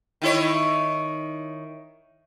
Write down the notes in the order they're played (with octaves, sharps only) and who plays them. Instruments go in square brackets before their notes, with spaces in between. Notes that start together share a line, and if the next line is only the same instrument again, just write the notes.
[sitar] D#3 E4 C#5